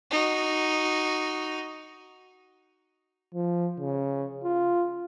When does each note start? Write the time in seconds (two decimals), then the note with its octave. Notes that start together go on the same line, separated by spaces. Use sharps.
0.11 D#4 F#4
3.34 F3
3.79 C#3
4.43 F4